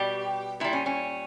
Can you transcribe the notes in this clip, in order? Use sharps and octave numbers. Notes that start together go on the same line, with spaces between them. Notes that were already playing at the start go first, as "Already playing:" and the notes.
Already playing: B2 G3 G4
A#2 G3 E4
C#4
C#4